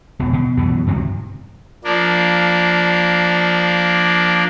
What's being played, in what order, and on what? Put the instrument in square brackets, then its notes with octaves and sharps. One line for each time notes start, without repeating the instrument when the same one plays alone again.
[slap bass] E1 B2
B2
F#2 B2 E3 B3
G2 C3 D#3 F#3
[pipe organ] F3 A#3 D4